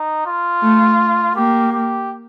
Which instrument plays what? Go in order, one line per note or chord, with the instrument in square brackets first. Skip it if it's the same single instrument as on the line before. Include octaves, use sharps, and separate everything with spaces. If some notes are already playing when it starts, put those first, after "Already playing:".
Already playing: [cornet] D#4
F4
[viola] A3
[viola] A#3 [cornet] G4
[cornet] G4